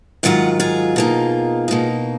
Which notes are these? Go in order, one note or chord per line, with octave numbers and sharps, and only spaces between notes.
G#2 D#3 F#3 F4 F#5
F4 G#4
B2 A#3 D#4
B2 A#3 D#4